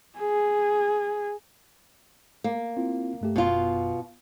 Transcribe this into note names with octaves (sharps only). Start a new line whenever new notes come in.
G#4
A#3
C4 E4 F4
G2 A3 G4
G1 F#2 B2 F4